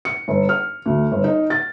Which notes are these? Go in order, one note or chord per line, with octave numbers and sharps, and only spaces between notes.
C#7
G1
F6
D2
G1
D#4
A6